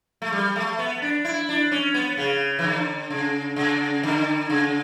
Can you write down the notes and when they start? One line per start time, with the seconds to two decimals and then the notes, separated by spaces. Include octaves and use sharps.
0.22 A3
0.33 G3
0.56 A3
0.79 B3
1.02 D4
1.25 E4
1.49 D4
1.72 C#4
1.94 B3
2.17 C#3
2.59 E3
2.64 D3
3.10 C#3
3.56 C#3
4.03 D3
4.50 C#3